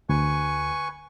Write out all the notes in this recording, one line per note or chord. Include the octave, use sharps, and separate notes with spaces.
D2 B4 G#5 C#6